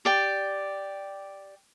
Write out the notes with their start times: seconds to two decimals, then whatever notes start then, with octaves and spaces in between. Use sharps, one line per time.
0.05 G4 D5 G5